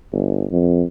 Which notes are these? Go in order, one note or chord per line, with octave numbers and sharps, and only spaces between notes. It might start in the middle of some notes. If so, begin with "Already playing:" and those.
G1
F2